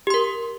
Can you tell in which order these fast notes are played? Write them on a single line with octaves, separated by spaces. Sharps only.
G4 C6 A#4